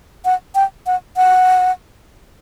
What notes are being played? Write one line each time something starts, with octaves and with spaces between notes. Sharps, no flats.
F#5
G5
F#5
F#5